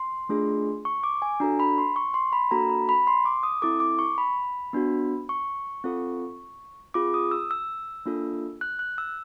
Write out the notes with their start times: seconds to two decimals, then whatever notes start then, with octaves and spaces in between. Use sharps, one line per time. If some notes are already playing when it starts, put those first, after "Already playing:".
Already playing: C6
0.29 A3 D4 F4 G#4
0.85 C#6
1.03 D6
1.22 G#5
1.40 D4 F#4 A4 A#5
1.60 B5
1.78 C6
1.96 C#6
2.14 C6
2.33 B5
2.51 A#3 D4 F#4 A4 A#5
2.69 B5
2.89 B5
3.07 C6
3.25 D6
3.43 D#6
3.62 C4 E4 A4 D6
3.80 D6
3.99 C#6
4.18 B5
4.73 B3 D4 F#4
5.29 C#6
5.84 C4 F4 A4
6.94 C4 F4 G#4 D6
7.14 D#6
7.31 E6
7.51 E6
8.06 A#3 D4 F4 A4
8.61 F#6
8.79 F#6
8.98 E6